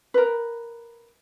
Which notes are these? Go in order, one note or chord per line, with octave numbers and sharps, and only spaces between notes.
A#4 B4